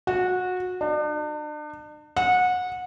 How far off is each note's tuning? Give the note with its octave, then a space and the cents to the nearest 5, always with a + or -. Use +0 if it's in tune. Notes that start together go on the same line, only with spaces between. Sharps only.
F#4 -20
D4 +40
F#5 -25